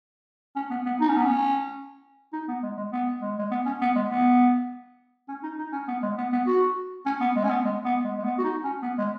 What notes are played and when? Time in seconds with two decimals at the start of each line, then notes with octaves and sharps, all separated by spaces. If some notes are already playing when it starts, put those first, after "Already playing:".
0.56 C#4
0.70 B3
0.86 B3
1.01 D#4
1.09 C#4
1.17 B3
1.25 C#4
2.33 D#4
2.48 B3
2.63 G#3
2.77 G#3
2.92 B3
3.22 G#3
3.39 G#3
3.51 B3
3.66 C#4
3.81 B3
3.96 G#3
4.10 B3
5.29 C#4
5.43 D#4
5.58 D#4
5.72 C#4
5.88 B3
6.02 G#3
6.17 B3
6.32 B3
6.47 F#4
7.06 C#4
7.21 B3
7.36 G#3
7.44 C#4
7.50 B3
7.65 G#3
7.85 B3
8.04 G#3
8.18 G#3
8.24 B3
8.38 F#4
8.44 D#4
8.64 C#4
8.83 B3
8.98 G#3